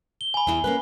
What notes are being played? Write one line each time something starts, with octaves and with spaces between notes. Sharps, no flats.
G7
G#5 B5
E2 E4
A#3 C#4 B4